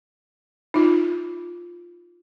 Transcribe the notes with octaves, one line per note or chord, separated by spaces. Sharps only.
D#4 F4